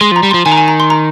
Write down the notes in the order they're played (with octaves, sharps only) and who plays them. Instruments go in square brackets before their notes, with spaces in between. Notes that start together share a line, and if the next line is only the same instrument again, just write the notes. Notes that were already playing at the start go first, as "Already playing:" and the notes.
[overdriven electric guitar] G#3 [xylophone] C6
[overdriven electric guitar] F3
[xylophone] A#5
[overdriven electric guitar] G3
[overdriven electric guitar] F3 [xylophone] C6
[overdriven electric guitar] D#3 [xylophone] G#5
[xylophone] A#5
G#5
A#5
C6
A#5